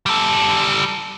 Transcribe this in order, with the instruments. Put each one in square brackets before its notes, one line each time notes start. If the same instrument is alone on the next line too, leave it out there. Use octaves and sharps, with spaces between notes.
[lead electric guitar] G3 A4